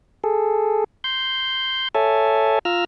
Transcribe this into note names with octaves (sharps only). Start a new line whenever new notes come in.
G#4 A4
C6 G6
A4 C#5 E5 G#5 A5
F4 A#5 E6 F6